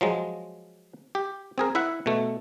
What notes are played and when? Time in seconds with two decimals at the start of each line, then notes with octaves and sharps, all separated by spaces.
0.01 F3 F#3 G#3
1.15 G4
1.58 C4 G#4 A#4
1.75 E4 E5 F#5
2.06 B2 A3